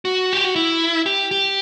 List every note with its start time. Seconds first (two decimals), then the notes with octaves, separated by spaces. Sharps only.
0.05 F#4
0.33 G4
0.44 F#4
0.56 E4
1.06 G4
1.31 G4